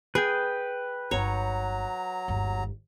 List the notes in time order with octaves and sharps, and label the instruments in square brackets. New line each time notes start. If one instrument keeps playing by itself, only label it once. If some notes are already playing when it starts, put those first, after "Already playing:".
[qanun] G#4 [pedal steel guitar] B4 G5
[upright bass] G1 D#4 [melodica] F#3 A#5 [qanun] C#5
[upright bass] G1 D#2